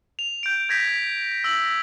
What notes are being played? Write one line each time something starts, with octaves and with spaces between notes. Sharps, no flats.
F7
G6 D7
G6 G#6 A#6 B6
E6 A#6 F#7